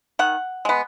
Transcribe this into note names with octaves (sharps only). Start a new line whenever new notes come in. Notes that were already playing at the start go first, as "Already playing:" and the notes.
D#3 F#5
G#3 B3